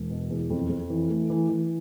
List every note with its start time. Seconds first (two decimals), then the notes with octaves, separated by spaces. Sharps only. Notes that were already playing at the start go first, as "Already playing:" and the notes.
Already playing: E1
0.10 B2
0.31 E2
0.50 F2
0.69 F2
0.90 E3
1.10 A3
1.30 E3
1.49 E3